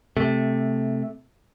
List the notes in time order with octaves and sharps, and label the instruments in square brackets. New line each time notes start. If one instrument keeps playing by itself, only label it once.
[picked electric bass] C3 A3